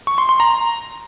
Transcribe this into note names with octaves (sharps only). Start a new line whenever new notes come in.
C#6
C6
C6
A#5